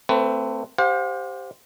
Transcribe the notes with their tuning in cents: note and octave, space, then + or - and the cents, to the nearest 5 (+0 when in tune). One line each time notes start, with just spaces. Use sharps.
A3 +30 C4 +0 B4 +20
G4 +0 C5 +0 F5 +40